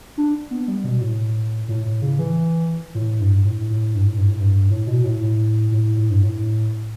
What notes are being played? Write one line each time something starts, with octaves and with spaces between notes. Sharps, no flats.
D4
B3
G3
B2
A2
A2
A2
C#3
E3
A2
G2
A2
A2
G2
A2
G2
A2
G2
A2
B2
A2
A2
A2
A2
G2
A2